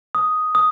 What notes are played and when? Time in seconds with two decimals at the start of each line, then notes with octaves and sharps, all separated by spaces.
0.15 D#6
0.55 D#6